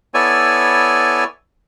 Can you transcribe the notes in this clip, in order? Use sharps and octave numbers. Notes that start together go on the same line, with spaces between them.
B3 E4 A4 C#5 D5 G#5